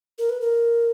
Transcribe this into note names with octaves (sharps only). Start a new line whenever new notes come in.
A#4
B4
A#4